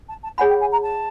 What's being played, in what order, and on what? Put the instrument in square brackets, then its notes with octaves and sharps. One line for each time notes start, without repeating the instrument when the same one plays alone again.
[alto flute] A5
A5
[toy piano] G#4 C#5 F#5 B5 [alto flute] G#5
[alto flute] G5
G#5
A#5
A5